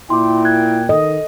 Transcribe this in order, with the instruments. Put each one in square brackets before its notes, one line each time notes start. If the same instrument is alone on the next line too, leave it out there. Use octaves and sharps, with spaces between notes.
[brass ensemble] A#2 G5 [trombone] E4 [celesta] C6 D6
[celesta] F#6 G#6
[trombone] D#3 [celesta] A4 [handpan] D#5